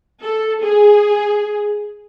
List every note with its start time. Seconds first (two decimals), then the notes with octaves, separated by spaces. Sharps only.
0.22 A4
0.62 G#4